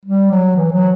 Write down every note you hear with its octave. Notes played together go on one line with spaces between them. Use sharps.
G3
F#3
E3
F#3